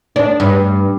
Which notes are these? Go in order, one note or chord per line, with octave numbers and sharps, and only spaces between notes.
D4
G2